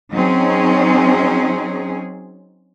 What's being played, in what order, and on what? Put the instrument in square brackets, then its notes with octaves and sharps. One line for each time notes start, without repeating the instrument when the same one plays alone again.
[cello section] F#3 C4 C#4 D#4 G#4